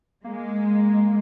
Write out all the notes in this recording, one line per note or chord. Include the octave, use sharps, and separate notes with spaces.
G#3 A#3